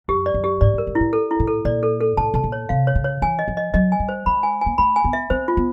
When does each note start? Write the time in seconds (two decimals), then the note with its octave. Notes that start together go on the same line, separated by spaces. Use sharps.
0.08 F#2 G4
0.26 D5
0.34 F#2
0.44 G4
0.61 G#2 D5
0.74 G2 A#4
0.87 G#2
0.95 E4
1.00 A2
1.13 A4
1.31 E4
1.40 A2
1.47 A4
1.65 A#2 D5
1.83 A4
2.01 A4
2.17 A2 A5
2.34 B2 A5
2.44 A#2
2.52 C#5
2.69 C3 F5
2.87 C#5
2.95 C#3
3.04 C#5
3.22 E3 G#5
3.39 D#5
3.48 F3
3.57 D#5
3.74 F#3 D#5
3.92 G#5
4.00 G3
4.09 C5
4.26 G#3 B5
4.43 G#5
4.61 A#3 G#5
4.78 A3 B5
4.96 G#5
5.04 B3
5.13 E5
5.30 C4 C5
5.48 F4
5.57 B3